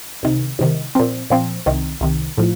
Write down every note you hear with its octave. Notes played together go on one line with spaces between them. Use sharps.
C2 C3 D#3
C2 C3 D#3
A#2 F3 C4
A#2 F3 C4
C2 C3 D#3
C2 C3 D#3
A2 F3